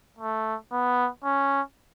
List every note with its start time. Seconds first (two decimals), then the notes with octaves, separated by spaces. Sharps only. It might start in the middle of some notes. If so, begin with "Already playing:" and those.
0.19 A3
0.72 B3
1.24 C#4